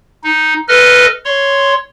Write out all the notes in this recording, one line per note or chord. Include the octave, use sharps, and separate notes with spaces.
D#4
A4 B4 D#5 F6
C#5 C6